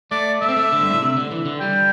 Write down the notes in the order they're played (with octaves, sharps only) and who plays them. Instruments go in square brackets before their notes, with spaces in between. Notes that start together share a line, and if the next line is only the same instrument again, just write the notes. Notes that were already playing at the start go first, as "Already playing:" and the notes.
[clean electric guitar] A3 [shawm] D5
[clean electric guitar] A3 [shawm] E5
[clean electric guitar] C4
A3
D3
G2
A2
C3
D3
E3
D3
[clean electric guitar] G3 [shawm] G5